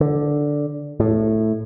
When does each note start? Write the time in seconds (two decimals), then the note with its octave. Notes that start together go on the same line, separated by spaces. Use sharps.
0.01 D3
1.00 A2